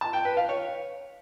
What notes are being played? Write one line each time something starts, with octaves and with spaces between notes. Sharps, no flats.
A5
G5
B4
F5
C#5